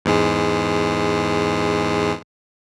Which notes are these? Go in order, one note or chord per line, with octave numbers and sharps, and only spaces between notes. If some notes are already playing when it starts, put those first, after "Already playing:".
E2 G#2 G#3